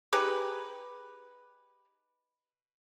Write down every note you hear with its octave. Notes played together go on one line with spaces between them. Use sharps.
D#4 G4 G#4 B4